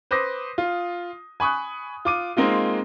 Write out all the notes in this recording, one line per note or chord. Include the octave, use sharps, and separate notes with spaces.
B4 C5 D6 D#6 A#6
F4
G#5 B5 C#6 D#6 F#6
F4 D6 D#7
G#3 A#3 C4 D#4 F4